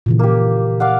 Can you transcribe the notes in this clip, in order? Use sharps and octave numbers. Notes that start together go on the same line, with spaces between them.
A#2 C#3 E3
A#3 G4
D5 F5 F#5